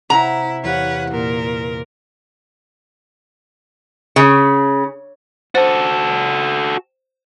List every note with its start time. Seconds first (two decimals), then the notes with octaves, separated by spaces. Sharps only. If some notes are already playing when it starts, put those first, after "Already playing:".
0.10 C3 E4 C5 F#5 A#5
0.64 E2 G4 B4 C#5 F5 F#5
1.11 A#2 A#4
4.16 C#3
5.55 F#4 A4 C5